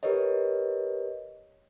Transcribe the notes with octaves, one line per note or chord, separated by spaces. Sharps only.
G4 A#4 B4 C#5 D#5